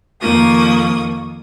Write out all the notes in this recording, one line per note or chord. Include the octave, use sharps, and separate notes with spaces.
F2 D#3 A#3 C#6 D#6